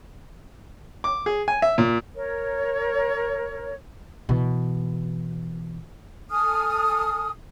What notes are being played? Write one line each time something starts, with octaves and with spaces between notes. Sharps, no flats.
D6
G#4
G#5
E5
A#2
A#4 C#5
B2 E3
A4 G#5 D#6 F6